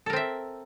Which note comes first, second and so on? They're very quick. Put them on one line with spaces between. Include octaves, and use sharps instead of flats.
A4 A#4 C4 E5